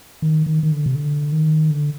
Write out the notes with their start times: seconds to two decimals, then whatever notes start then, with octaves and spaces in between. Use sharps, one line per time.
0.22 D#3
0.46 D#3
0.63 D#3
0.72 D3
0.86 C3
0.95 D3
1.32 D#3
1.71 D3